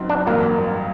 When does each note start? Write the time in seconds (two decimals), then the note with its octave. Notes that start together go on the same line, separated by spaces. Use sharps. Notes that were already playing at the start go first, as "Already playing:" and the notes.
Already playing: F#1 F#2 F#3 C4 D#4
0.09 D4
0.26 A1 G2 F#3 A#3